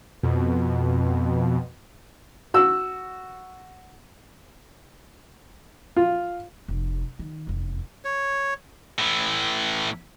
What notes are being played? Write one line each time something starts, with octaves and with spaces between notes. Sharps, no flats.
F2 B2
F#4 E6
F4
F1
D#3
F1 E2
C#5
A2 E3